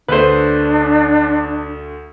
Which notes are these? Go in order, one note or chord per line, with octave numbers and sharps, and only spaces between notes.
D2 A3 D4 B4 C5